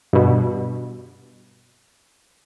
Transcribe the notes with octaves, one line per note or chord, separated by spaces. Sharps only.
G2 B2